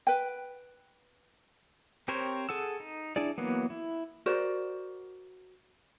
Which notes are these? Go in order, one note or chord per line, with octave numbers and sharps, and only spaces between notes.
B4 G5
C4 G4 A#4 C5 C#5
G#4 A4 F#5 E6
D#4
D4 E4 G#4 D5
E3 F#3 A#3 B3
E4
F#4 A#4 C5 D5